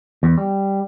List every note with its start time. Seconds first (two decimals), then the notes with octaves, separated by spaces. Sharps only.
0.23 E2
0.38 G3